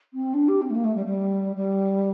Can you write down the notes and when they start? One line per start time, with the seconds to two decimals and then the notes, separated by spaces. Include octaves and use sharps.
0.13 C4
0.34 D4
0.48 G4
0.61 C4
0.70 A3
0.74 A#3
0.84 A3
0.95 G3
1.05 G3
1.55 G3